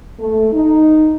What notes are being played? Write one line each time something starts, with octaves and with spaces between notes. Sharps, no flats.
A3
D#4